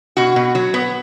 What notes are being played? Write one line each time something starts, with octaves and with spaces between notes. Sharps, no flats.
B2 F#4
B2
F#3
B3